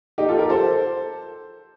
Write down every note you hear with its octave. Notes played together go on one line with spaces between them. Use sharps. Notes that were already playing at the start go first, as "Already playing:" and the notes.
D#4 G4
F4 A4
G4 A#4
A4 C5